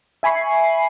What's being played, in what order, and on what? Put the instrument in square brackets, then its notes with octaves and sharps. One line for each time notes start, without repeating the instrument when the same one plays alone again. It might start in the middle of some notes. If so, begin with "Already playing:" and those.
[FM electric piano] E5 G#5 B5 C#6 C7